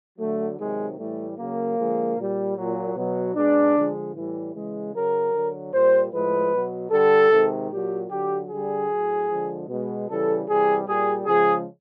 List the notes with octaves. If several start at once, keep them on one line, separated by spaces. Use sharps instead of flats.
D3 F#3 A3
C3 D#3 F#3 G#3
A2 E3 G3 A3
C#3 F#3 A#3
D3 F3 G#3
A#2 G3
A#2 F#3
B2 F#3
B2 G#3 D4
D3 F3 G#3
A2 E3 G3
C#3 E3 G#3
C#3 F#3 A#4
D3 F#3
A#2 G3 C5
A2 F3 G#3 B4
B2 F#3
D3 G3 A4
C3 D#3 G#3
A#2 F#3 G4
D3 F#3 G4
D3 G3 G#4
A2 F#3
D3 F3 G#3
B2 G#3
C#3 E3 G3 A4
C3 E3 G3 G#4
A#2 G3 G#4
C#3 F3 G#3 G#4